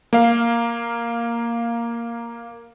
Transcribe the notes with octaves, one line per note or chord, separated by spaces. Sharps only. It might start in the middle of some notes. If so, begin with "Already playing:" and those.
A#3 F5